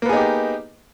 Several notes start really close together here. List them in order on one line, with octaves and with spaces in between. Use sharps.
A#3 B3 G#4 D#4 G4